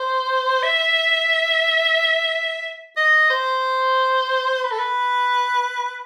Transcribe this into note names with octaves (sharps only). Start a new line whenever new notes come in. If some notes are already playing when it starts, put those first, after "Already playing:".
Already playing: C5
E5
D#5
C5
B4
A4
B4